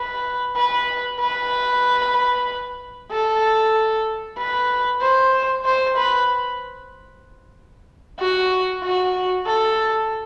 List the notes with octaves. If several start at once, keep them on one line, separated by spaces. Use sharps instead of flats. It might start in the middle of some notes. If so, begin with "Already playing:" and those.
Already playing: B4
B4
B4
A4
B4
C5
C5
B4
F#4
F#4
A4